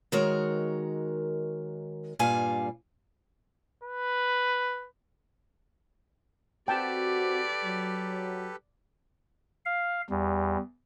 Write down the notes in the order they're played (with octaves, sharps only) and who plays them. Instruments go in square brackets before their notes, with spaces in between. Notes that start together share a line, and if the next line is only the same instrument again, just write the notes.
[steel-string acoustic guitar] D#3 G#3 F#4 A#4 C#5
G2 A#2 G3 F5 G#5
[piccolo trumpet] B4
[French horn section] C4 F#4 [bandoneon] G4 A4 B4 [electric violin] D5 [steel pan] G5 A5
[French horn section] F#3
[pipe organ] F5
[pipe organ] E2 [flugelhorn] G3